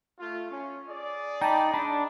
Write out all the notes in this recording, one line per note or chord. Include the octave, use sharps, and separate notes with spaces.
A3 F4
C#4
G#4 D5
D#4 G5 A5 B5
D4 B5